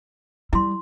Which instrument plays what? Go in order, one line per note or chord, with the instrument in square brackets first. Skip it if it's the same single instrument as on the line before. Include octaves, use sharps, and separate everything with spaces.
[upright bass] G3 [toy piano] E4 C6